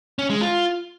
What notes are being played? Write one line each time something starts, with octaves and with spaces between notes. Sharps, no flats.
C#4
G#3
F4